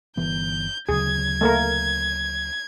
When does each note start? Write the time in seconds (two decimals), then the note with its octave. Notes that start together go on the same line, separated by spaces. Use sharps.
0.17 G1 E3 B3 G6
0.89 D2 C#3 F#3 G#4 G#6
1.41 A3 A#3 A#4